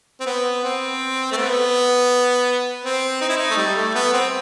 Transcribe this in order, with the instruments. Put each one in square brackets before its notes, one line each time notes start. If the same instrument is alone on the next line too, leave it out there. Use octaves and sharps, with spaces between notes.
[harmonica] C4
B3
C4
A3
B3
C4
D#4
E4
D#4
A3
G3
A3
B3
C4